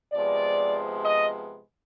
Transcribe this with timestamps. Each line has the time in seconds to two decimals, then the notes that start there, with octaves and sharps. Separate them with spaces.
0.13 C3 F3 G#3 B3 D5
1.05 D#5